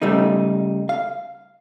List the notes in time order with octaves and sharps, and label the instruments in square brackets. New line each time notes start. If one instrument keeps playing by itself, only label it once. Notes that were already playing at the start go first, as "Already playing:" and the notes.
[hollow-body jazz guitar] C#3 G3 A3 D#4
F5